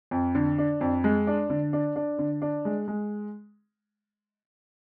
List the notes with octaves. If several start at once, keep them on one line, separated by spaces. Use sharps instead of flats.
F2
D3
D4
F2
G#3
D4
D3
D4
D4
D3
D4
G#3
G#3